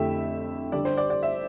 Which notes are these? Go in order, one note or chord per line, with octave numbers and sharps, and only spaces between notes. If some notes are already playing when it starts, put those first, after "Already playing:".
Already playing: F2 D3 A3 E4 G4 E5
D3 G3 D4 G4 D5
C5
D5
D5
E5